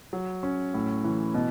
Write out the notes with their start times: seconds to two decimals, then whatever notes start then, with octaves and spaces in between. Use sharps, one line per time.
0.13 F#3
0.43 C#4
0.74 A2
1.04 E3
1.34 B2